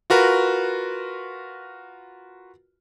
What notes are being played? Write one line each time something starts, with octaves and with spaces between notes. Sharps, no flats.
F4 F#4 A#4 B4